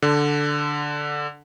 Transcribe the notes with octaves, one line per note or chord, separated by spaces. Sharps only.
D3